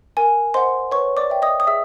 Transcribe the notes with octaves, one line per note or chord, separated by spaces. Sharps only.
A#4 G#5
C5 D#5 F#5 C6
B4 C#5 C#6
D5 D6
E5 G5
D#5 D#6
D#6
G#4 E5 E6